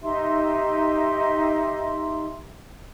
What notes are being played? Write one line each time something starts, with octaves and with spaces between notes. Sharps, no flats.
D#4 G4 E5 C6